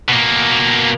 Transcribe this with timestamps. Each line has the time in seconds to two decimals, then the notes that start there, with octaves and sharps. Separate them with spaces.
0.09 B2 A#3